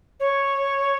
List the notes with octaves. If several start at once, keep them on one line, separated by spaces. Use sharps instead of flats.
C#5